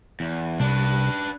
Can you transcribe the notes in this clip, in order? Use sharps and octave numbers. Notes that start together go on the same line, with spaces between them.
E2
C2 D4 B4